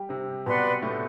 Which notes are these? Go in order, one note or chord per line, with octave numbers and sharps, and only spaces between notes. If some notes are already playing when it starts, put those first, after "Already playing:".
Already playing: G3 G4
C3 C4
B2 B3 B4 D5 F#5 C6
A2 A3